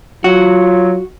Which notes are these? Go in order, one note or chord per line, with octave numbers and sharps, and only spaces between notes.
F#3 F4 F#4